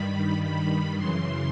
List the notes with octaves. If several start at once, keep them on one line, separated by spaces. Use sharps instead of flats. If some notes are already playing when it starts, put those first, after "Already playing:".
Already playing: G2 D#3 G3 B5
B5
F#2 C#3 E3 C6